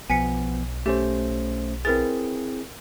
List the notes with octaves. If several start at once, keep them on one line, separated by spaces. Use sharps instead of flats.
B1 F3 B3 G#5 B6 C#7
A3 C#4 G4 C5
C4 E4 G#4 A#4 B4 A6